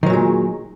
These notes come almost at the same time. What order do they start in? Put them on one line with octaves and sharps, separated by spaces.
D#3 F#3 A#2 G#3